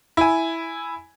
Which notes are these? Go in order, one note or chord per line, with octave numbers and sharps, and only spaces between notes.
E4 G#5